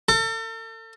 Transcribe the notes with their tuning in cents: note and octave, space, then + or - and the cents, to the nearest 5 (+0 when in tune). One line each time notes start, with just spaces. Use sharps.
A4 +40